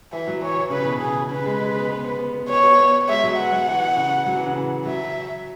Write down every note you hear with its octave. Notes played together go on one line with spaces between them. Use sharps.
E3 E5
F#3
E3 C#5
E3
C#3 B4
B2
C#3 G#4
C#3 B4
G#3
G#3
B3
B3
B3
B3
B3
B3 C#5
B3
B3
G#3 E5
F#3
B3 F#5
F#3
E3
C#3
F#3
E3
C#3
E3
F#3 E5